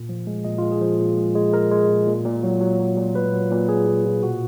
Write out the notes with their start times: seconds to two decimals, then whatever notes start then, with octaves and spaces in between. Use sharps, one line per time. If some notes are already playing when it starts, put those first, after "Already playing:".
Already playing: A#2
0.09 F3
0.27 G#3
0.45 A#2 D#5
0.58 F4
0.62 G#3
0.72 G#4
0.81 F3
0.99 A#2
1.17 G#3
1.35 G#3
1.53 G#3 A#4
1.71 G#3
1.89 A#2
2.07 A#2
2.25 A#2
2.43 F#3
2.61 F#3
2.79 F#3
2.97 A#2
3.15 A#2 B4
3.33 F#3
3.51 A#2
3.69 F#3 G#4
3.87 A#2
4.05 A#2
4.23 B2 F#4